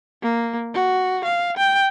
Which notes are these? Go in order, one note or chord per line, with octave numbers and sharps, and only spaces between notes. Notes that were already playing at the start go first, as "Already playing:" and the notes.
A#3
F#4
F5
G5